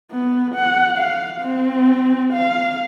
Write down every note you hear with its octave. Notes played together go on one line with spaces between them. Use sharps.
B3
F#5
F5
C4
F5